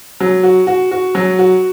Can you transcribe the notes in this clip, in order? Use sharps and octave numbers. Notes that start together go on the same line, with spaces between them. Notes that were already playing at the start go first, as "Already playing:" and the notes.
F#3
F#4
F#4
F#4
F#3
F#4